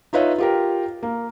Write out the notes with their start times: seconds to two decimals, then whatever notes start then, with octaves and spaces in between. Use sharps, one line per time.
0.13 D#4 F4 B4 C#5 D#5 E5
0.38 F4 G4 A#4
1.03 A#3